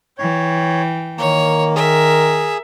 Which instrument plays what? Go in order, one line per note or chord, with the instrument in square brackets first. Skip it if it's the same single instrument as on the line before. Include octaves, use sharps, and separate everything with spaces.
[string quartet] E3 G5 [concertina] C#5
[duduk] D#3 [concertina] A#3 [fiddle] C#5
[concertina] G#4 [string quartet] A#4 [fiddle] E5